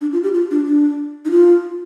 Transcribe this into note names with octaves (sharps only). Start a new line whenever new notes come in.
D4
F4
G4
F4
D4
D4
D#4
F4